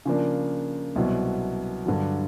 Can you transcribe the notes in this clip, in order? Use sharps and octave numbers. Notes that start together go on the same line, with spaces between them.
C#3 F3 A#3 D4
C2 B2 F#3
G2 D3 F#3